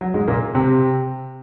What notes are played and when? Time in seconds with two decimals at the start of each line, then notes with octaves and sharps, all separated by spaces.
0.01 F#3
0.14 G#2 G#3
0.28 A#2 A#3
0.54 C3 C4